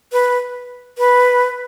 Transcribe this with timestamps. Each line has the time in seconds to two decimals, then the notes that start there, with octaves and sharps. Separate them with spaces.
0.12 B4
0.98 B4